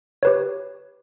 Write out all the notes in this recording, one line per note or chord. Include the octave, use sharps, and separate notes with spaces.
G4 B4 C#5